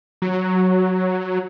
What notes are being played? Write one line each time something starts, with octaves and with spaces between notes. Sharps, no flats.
F#3